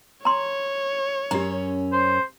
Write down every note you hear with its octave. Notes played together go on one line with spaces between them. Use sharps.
C#5 A#5 C6
F#2 C#4 G4 A#5
C5